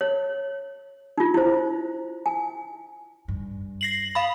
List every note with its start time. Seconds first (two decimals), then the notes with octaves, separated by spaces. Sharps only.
0.01 C#5
1.18 D#4 F4
1.34 E4 C5
2.26 G#5
3.28 G2
3.81 A#6 C7 F#7
4.15 F5 B5